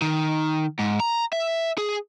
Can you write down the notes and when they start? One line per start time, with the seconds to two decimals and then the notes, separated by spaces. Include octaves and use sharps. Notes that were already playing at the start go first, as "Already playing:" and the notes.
0.02 D#3
0.79 G#2
1.00 A#5
1.33 E5
1.78 G#4